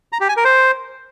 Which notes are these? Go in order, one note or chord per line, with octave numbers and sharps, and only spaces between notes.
A#5
G4
G#5
A#4
C5